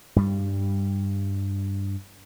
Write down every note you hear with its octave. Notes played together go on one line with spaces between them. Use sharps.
G2 G3